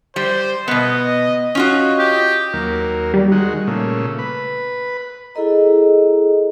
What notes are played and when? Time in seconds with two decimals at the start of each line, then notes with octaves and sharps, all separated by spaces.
0.16 G3 C5
0.68 B2 B3 D#5
1.55 C#4 F4 F#4 D#5
1.99 G4
2.53 D#2 F#3 A#3
3.14 G3
3.32 D#3 G#3 F#4
3.67 A#2 C#3 A3
4.19 B4
5.35 E4 G#4 A4 D#5 A#5